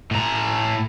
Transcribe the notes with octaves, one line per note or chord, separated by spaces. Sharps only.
A2 A#5